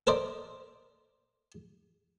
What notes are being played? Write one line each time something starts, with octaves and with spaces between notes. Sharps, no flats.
A4 A#4 C5 D5 D#5